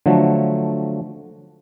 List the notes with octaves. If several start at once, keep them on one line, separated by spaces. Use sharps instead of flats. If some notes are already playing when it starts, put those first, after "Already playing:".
D3 F3 F#3 A3